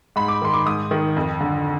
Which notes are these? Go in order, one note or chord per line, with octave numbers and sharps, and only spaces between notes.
G#2 B5
D6
D#3 C6
D6
G#2 D#6
D#3
F2
D3